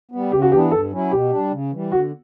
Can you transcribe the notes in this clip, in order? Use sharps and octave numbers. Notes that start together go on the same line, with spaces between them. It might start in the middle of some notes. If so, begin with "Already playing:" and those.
G3 B3
C#3 G4
F#4
E3 B3 D4 G4
G2 A4
F#3 C#4 E4
B2 G4
G3 D4
C#3
E3 G3
D3 F#4